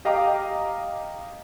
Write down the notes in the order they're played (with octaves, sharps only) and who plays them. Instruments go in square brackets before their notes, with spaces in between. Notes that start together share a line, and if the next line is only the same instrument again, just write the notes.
[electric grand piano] G4 D#5 F5 G5 A#5 D6